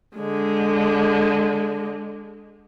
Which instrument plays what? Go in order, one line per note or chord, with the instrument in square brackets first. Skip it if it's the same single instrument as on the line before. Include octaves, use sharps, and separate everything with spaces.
[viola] D3 G#3